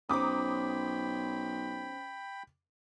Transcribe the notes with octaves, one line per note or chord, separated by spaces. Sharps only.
B1 C#4 C5 G5 A#5 B5 D6 D#6